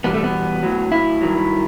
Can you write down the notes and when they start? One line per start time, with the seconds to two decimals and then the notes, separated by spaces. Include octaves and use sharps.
0.04 E2 B2 G3 B3
0.14 A3
0.24 B3
0.63 A2 F#3
0.92 E4
1.21 G2 D#3 F#3